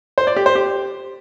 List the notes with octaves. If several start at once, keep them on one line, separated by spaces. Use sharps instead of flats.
C5
D5
G4
C5
G4